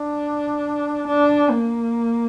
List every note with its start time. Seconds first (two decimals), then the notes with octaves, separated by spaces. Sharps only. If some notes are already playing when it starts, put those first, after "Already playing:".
Already playing: D4
1.07 D4
1.50 A#3